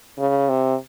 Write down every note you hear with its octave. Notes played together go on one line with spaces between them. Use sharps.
C#3
C3